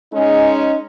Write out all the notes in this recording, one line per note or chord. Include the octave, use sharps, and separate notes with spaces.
G#3 C#4 D#4